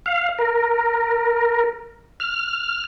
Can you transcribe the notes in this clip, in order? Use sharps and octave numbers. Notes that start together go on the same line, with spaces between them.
F5
A#4
F6